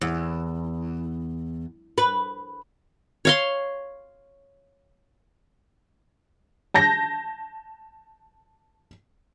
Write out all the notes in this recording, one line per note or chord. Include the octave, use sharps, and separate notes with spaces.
E2
B4
C#5 F5 C6
A5 G6 A#6